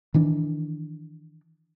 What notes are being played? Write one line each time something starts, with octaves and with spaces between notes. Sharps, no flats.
D#3 E3 D4